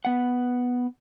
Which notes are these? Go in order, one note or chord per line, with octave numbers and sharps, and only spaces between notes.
B3 F#5